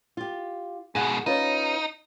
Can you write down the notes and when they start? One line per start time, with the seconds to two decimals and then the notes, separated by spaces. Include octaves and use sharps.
0.17 F4 G4
0.95 G#2 B2 G#4 F#5
1.26 C#4 D#4 F4 B4